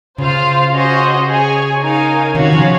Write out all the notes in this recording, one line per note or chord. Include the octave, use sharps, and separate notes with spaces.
C#3 F4 C5 F5
C#4 F#4 C5 D#5
G#4 C#5 G#5
D#4 A#4 C#5 F5 G#5
C3 D#3 C#4 F#4 C#5 F5
C#3 F3